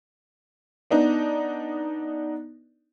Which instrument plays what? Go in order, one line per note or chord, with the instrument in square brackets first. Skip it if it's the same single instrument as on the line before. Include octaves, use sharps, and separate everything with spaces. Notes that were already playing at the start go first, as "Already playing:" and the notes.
[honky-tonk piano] B3 D4 D#4